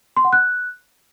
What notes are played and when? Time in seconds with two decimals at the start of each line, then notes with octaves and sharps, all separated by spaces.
0.17 C6
0.25 F#5
0.33 F#6